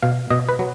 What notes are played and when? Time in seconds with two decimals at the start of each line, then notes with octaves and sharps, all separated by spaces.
0.03 B2 F5
0.30 B2 D#5
0.49 B4
0.59 F#3